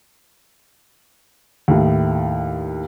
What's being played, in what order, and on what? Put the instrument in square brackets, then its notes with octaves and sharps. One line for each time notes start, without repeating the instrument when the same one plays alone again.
[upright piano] D#2 A2